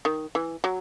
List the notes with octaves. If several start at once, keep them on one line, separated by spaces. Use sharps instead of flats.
D#3
E3
F#3